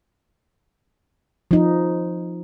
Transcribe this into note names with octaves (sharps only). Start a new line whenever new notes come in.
F3 D#4